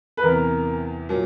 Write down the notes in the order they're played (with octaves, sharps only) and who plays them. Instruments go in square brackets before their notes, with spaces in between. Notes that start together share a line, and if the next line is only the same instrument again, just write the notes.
[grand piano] B4
[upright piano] E2 C3 E3 [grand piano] A#4
[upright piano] A#2 F#3